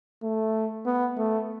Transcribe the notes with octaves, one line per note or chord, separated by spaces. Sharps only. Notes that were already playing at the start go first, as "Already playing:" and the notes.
A3
B3
A3